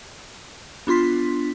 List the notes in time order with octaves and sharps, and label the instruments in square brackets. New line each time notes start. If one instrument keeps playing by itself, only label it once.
[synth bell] B3 D4 F4 C6 B6